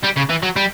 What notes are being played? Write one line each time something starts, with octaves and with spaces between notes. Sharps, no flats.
G3
C#3
E3
F#3
G3